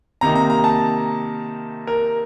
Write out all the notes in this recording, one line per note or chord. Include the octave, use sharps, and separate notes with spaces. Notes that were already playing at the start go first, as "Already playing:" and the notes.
C3 D#3 A#3 D#4 A#5
A#5
A#5
A5
A#4